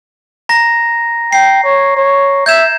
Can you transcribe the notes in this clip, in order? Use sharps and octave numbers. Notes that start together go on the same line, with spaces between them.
A#5 A#6
G5 C7
C#5
C#5
E5 G6 G#6 E7